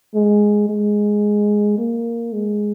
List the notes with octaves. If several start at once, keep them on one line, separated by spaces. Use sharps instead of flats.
G#3
G#3
A#3
G#3